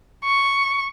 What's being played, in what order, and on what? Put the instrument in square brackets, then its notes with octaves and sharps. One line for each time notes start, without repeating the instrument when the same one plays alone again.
[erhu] C#6